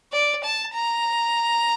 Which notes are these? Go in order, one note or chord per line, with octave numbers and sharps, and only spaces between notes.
D5
A5
A#5